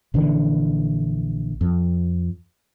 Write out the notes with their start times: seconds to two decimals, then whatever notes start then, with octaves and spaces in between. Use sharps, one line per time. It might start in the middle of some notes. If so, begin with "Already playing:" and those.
0.14 A#1 D3 E3
1.61 F2